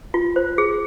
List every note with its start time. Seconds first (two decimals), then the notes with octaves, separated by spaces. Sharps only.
0.14 F4
0.36 C5
0.58 G#4